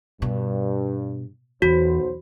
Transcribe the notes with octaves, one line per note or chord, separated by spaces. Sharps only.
G2 B2
B1 E2 F#3 F#4 C5